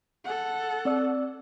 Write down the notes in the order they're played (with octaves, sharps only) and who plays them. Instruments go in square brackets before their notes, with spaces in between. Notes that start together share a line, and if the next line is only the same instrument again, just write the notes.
[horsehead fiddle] A4 F#5
[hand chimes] C4 D5 E6